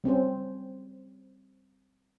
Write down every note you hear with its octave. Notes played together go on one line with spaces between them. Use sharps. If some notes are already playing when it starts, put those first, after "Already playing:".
G3 C4 C#4 C5